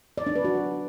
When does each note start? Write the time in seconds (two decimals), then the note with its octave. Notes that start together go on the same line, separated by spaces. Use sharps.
0.18 D5
0.27 D4
0.35 B4
0.44 F#4